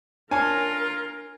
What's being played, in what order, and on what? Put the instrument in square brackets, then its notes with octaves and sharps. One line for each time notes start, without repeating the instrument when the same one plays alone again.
[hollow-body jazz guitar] D4 C#5 A5 [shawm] F4 [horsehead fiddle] A#4 [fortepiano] G#5